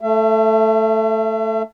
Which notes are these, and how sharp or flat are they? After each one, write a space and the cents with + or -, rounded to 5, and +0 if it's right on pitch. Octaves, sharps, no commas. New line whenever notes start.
A3 +0 E5 +40